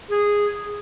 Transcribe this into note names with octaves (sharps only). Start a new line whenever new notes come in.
G#4